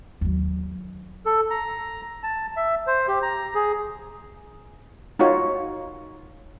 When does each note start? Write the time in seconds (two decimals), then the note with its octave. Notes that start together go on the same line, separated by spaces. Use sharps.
0.21 D#2 F#3
1.26 A4
1.50 A#5
2.23 A5
2.57 E5
2.87 C5
3.08 G4
3.22 A#5
3.55 G#4
5.19 D#4 F4 F#4 C#5